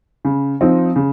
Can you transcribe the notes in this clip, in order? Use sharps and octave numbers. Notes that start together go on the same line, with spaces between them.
C#3
F3 C4 D#4
C#3